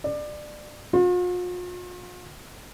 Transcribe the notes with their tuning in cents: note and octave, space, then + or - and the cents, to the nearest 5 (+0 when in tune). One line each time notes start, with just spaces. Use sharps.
D5 +25
F4 +45